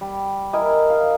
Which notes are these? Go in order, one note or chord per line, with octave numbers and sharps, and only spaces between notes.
G3
E4 A#4 D#5 G#5
F5